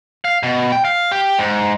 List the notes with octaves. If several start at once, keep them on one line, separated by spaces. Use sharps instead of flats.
F5
B2
G5
F5
G4
G#2